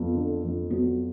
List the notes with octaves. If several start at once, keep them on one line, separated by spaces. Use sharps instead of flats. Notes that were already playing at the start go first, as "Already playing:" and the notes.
Already playing: F2 B3
D3
F2
F#3 B3